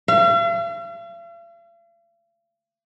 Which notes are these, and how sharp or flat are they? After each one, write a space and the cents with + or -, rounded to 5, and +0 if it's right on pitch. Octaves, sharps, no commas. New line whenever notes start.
F5 -45